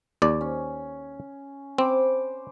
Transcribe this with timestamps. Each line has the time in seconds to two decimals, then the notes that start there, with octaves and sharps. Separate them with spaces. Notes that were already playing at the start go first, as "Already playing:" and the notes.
0.22 D#2 D5
0.41 C#4
1.78 C4 C5 B5 D6